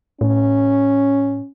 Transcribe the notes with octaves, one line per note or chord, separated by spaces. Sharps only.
A2 C#4